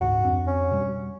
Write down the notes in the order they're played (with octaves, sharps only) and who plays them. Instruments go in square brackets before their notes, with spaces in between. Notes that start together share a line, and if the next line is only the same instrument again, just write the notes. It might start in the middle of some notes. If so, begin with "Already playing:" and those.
[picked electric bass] F#1 D2 G#2 [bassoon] F#4
[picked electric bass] F2 C4 D4
[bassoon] C#4
[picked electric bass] B2 G3